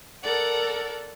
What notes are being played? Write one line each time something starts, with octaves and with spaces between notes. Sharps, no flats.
A4 A#4 D5 F#5